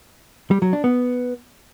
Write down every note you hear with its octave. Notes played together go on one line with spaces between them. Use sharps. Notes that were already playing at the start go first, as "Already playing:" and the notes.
G3
F#3
D4
B3